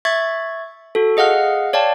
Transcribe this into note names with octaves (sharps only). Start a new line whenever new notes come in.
E5 C#6 G#6 A6
F#4 A4
G#4 D#5 F5 F#5 F6
C#5 D5 F5 G5 A5